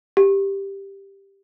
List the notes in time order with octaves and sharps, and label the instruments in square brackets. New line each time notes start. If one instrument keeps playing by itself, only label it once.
[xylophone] G4